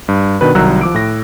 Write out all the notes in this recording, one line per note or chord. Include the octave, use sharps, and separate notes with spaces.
G2
B2 D#3 D4 B4
C2 D#3 F#3 A#5 E6 F#6
F3 D6 D7
A2 A#6